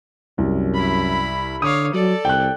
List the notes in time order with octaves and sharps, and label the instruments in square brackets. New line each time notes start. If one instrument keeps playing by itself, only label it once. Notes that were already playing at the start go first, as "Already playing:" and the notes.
[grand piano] C2 [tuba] F#2
[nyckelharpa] E4 B5
[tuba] D3 [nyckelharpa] C#5 F5 [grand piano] D6 D#6
[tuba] F#3 [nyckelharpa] A4 D5
[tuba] C2 [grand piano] G5 F#6